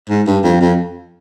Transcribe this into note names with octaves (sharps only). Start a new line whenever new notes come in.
G#2
G2
F2
F2